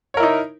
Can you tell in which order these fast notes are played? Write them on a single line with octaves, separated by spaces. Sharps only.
C#5 A#4 E4 D#4